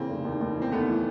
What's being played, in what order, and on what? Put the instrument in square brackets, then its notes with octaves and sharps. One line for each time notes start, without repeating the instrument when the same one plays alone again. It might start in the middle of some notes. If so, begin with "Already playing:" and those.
Already playing: [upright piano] C#3 E3 [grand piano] A#3 C4
[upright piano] F1
D#2
D#2
E3
[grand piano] C4
[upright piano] D#2 [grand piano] A3 B3
[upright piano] E3